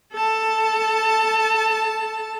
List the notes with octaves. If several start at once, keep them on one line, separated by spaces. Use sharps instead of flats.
A4 A5